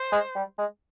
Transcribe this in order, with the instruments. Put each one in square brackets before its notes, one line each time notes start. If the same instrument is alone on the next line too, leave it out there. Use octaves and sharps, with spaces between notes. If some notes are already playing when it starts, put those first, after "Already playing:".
Already playing: [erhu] C5
[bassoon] G#3
G3
G#3